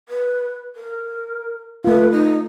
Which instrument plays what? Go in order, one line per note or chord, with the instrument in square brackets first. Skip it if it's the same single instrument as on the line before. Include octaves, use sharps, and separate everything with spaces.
[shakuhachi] B4
A#4
[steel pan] A3 F4 [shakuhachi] B4
[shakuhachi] D#4